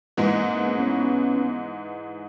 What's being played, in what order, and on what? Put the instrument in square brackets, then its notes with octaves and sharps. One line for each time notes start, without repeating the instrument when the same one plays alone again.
[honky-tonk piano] G#2 E3 G#3 [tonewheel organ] A#3 C4
[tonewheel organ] C4
B3 C#4